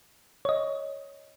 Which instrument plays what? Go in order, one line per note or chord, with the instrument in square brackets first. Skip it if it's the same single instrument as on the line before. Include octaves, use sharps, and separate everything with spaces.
[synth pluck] C#5 D#5